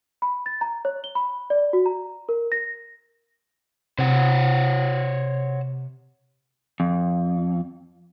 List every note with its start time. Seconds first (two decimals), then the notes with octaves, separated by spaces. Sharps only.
0.22 B5
0.46 A6
0.61 A#5
0.85 C#5
1.04 G7
1.15 B5
1.50 D5
1.73 F#4
1.86 A#5
2.29 A#4
2.52 A#6
3.99 C3 C5 C#5 F#5
6.80 F2